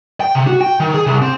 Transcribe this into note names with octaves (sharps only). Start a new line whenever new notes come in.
G5
C3
F#4
G5
D#3
G#4
C2
C4